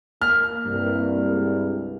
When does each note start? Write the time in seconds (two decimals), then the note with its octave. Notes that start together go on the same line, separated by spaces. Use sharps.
0.21 A#3 F6
0.66 C2 G2
1.30 G#3